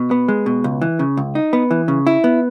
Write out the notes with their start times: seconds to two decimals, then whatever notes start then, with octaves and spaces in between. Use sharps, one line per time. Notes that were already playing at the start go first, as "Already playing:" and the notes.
Already playing: B2
0.11 B3
0.28 G#3
0.46 B2
0.64 C#2
0.82 E3
0.99 C#3
1.17 C#2
1.35 D#4
1.53 B3
1.71 E3
1.88 C#3
2.07 E4
2.24 B3